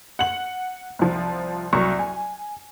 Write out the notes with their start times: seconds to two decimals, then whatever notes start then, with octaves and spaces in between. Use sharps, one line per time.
0.19 F#5 F#7
0.99 C2 F3
1.73 C2 F#3 C#6
1.99 G#5